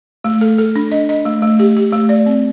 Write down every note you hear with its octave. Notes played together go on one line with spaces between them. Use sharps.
A3
A4
A4
D4
D#5
D#5
A3
A3
G4
G4
A3
D5
C4